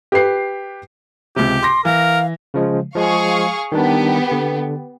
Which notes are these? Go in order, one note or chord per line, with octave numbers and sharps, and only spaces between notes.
G4 B4 C7
C#2 C3 G4
C6 D6 A#6
E3 A#4 F5
C#3 F3 G#3
F3 G#3 G#4 F5 C#6
D#3 G3 B3 D4 G4
D3